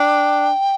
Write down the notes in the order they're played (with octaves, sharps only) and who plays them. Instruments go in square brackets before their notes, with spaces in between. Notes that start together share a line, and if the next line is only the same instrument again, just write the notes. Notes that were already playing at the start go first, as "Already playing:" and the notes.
Already playing: [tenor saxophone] D4 [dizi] G5